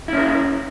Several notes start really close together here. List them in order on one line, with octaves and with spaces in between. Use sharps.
E4 C#4 A#4